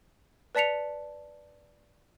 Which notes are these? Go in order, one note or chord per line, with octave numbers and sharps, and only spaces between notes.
B4 D5 A5 B6 C#7 F7